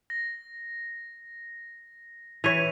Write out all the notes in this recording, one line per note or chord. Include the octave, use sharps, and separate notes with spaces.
A#6
E3 C#5 B6 D#7 F7